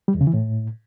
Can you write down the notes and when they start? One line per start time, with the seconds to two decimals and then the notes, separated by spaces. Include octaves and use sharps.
0.08 G3
0.14 E2
0.21 C#3
0.27 E3
0.33 A2